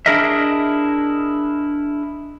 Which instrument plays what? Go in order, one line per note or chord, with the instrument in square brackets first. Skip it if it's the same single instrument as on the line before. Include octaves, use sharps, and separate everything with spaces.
[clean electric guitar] D4 E4 G#4 A#4 D#5 E5